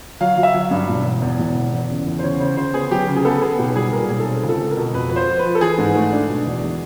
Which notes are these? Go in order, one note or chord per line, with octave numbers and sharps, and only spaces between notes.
F#3 F5
F#3 F5
E5
F#3
G2
E1
E2
E2
E1
E2
E2
C#3
E2
C5
C#3 C#5
C#3 C5
C#3 C5
B3 G#4
F#3 G4
C#3
G#4
B3 A4
B3 G#4
B1 G4
G3 G#4
A#2 A#4
B1 G#4
A4
C4 G#4
C#2
A4
G#3
A#4
B2
F2 B4
F3 B4
C5
F3
B4
F3
A4
E3 G#4
G#2
A3
D4
B2
E2
G#3